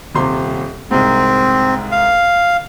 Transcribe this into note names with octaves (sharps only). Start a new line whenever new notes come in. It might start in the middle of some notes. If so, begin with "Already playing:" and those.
D#1 C3 C6
C2 G#2 C4
F5